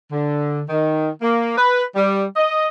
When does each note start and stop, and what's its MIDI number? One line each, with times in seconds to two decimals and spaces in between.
0.12 0.62 50
0.70 1.09 51
1.22 1.57 58
1.58 1.83 71
1.96 2.25 55
2.36 2.68 75